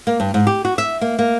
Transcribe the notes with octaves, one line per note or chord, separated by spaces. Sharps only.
A#3
G2
G#2
G4
F#4
E5
A#3
A#3